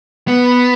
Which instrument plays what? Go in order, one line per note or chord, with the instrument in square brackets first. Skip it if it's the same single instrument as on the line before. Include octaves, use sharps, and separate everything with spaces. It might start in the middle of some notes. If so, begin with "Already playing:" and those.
[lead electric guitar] B3